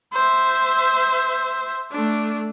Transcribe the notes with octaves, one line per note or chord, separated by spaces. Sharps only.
C5 E5
A3 D4